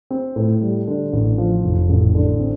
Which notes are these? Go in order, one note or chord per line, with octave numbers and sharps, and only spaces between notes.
C4
A2
G3
D3
A1
F3
F1
A1
D3
C4